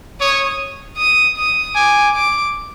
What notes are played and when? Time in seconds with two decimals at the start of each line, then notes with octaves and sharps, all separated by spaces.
0.21 C#5 D#6
0.98 D#6
1.37 D#6
1.75 G#5 D6
2.15 D6